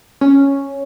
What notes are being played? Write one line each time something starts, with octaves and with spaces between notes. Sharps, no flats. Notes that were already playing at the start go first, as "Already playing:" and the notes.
C#4